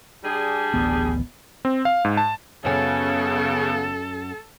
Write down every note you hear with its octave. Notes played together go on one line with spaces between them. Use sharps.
G3 D4 G#4
D1 A1 B3
C4
F5
G#2
A5
F#2 C#3 B3 C#4 A4